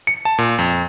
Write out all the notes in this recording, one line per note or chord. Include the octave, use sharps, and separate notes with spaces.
C#7
A5
A#2
F2